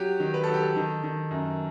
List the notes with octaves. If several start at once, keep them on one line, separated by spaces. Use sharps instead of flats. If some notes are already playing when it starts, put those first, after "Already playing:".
Already playing: F#3 G4
D#3
B4
F#3 A4
G4
A4
D#3
D#3
F#2